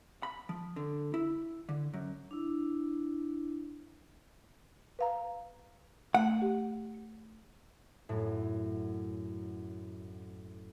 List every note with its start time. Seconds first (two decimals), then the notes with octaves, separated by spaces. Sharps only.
0.23 B5
0.49 F3
0.76 D3
1.14 E4
1.69 D3
1.94 F#2
2.31 D4 E4
4.99 B4 F5 A#5
6.15 A3 F#5
6.42 G4
8.09 F#2 A2